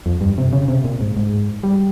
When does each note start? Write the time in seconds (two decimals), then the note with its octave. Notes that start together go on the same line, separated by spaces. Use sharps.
0.06 F2
0.21 G2
0.38 C3
0.53 C#3
0.68 C3
0.84 A#2
1.01 G#2
1.17 G#2
1.63 G3